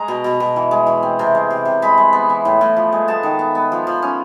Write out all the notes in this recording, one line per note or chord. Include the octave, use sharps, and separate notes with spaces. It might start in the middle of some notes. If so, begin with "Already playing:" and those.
Already playing: G#3 A#5
B2
B2
B2
E3
G#3
E3
C4
C3
G#3
C3
C3
G#3 B5
G#3
B3
E3
A2
A2
F3
G#3
B3 A5
D#3
B3
B3
F3
F3
C#4